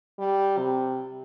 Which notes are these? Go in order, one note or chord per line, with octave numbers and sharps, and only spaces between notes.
G3
C3